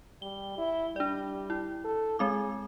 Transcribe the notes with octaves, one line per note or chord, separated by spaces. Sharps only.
G3 G7
E4
G3 D4 D5
E4
A4
G#3 C4 G#4 D6